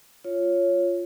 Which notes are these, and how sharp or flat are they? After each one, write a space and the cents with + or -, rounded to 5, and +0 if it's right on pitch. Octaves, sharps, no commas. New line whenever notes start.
F4 +0 C#5 +0